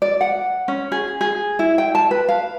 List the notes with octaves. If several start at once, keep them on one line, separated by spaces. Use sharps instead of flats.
D5
F#5
C#4
G#4
G#4
E4
G5
A5
B4
F5